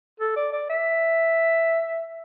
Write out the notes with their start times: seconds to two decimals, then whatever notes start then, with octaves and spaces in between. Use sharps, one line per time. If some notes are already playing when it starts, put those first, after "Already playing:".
0.20 A4
0.36 D5
0.53 D5
0.69 E5